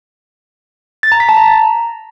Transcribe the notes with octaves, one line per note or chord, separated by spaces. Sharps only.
A6
A#5
B6
A5
A#5